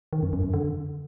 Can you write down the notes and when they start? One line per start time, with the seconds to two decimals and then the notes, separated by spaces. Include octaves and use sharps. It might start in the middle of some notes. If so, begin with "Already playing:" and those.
0.13 D#3
0.23 F#2
0.33 F#2
0.43 F#2
0.54 D3